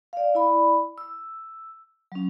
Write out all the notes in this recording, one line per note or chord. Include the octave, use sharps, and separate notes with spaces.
D5 F5
E4 D5 B5
E6
F#3 C#4